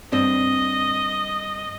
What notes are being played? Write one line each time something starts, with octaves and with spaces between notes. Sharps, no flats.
G2 C4 D4 D#5